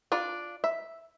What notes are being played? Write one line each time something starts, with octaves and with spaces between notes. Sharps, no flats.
D4 F4 D5
E5